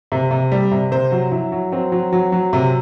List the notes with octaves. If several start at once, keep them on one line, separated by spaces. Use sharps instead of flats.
C3
C3
G3
C3
C3 C5
F#3
F#3 E4
F#3
F#3 C4
F#3
F#3
F#3
C3